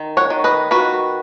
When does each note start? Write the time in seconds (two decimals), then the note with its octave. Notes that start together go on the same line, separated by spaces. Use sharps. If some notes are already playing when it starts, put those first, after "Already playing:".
Already playing: D#3
0.17 C#5 F#5
0.30 D#3
0.44 B4 D#5
0.71 D#3 F#4 B4